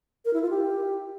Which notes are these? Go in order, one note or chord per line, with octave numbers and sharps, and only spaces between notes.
A#4
E4
F4
G4